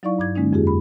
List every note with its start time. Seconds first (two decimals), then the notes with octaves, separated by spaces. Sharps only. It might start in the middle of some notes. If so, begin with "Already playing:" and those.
0.03 F#3 D#4 E4 D5 F5 C#6
0.18 G2 D6 G#6
0.36 D3 G#3 A#3 C#4 D#4
0.53 F2 F4 G4 G#4
0.67 B5